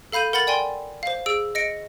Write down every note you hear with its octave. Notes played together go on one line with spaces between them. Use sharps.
A4 F5 B5 G6 D#7
A#4 F#5 B5 A6 F#7
D5 G5 G#5 C6
C5 F5
G#4 E6 D7
D#5 A#6 C#7 D7